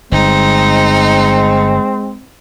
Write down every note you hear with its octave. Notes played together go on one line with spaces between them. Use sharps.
G1 G#3 C4 D#4